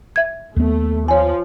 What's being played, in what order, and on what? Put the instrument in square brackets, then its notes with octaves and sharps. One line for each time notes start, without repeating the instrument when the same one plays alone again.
[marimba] E5 G#6
[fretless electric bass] D#2 B3 [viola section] A3
[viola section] F3 F4 [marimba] C#5 G#5